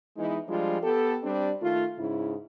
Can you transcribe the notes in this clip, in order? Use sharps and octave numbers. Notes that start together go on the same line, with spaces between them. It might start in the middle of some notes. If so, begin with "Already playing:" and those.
E3 G#3 B3 D#4 E4
F3 G3 G#3 D4 F4
B3 G4 A4
G3 C4 D4
D#3 A3 F4
G#2 C#3 E4